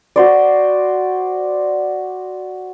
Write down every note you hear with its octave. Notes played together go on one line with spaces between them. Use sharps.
F#4 C5 D5